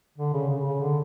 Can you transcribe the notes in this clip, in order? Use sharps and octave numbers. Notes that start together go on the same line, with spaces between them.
D3
C#3
C#3
C#3
D3